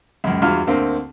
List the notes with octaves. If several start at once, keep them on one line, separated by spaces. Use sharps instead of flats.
C#2 F#2
E2 G2 F4 F#4 F6
D2 A#3 C4